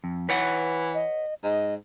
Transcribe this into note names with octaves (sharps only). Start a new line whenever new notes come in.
F2
E3 B4 C#5 F#5
D#5
G#2 D#5